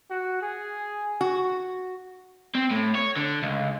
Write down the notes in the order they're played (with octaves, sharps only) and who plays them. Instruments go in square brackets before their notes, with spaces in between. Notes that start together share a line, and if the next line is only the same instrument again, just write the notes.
[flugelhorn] F#4
G#4
[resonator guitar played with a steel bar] F#4
[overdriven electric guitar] C4
A2
C#5
D3
C#2